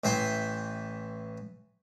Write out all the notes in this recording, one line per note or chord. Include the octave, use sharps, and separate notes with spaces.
A1 E3 E5 G5 C6